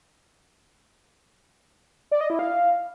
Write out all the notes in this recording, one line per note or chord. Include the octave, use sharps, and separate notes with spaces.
D5
D#5
E4
F5